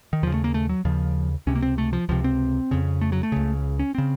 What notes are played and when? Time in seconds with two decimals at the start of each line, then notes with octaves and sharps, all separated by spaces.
0.13 D#3
0.23 D#2 F3
0.27 C#3
0.34 A3
0.44 A#3
0.54 A3
0.69 F#3
0.85 D#2 C#3 F3
1.47 C#2 C3 C#4
1.55 A#3
1.62 C4
1.78 A3
1.93 F3
2.09 C#2 C3 F3
2.24 C4
2.71 F2 C#3
3.01 A3
3.12 F#3
3.23 A3
3.32 C#2 C#3
3.79 C#4
3.95 C#3 C4